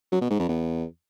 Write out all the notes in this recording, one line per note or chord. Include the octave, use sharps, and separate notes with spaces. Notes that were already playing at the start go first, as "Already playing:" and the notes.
F#3
B2
G#2
F2
E2